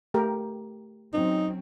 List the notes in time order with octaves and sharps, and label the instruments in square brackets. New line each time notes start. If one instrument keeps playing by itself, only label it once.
[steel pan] A3 G4 A#4
[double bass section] F#3 C4 C#4 [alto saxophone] D#4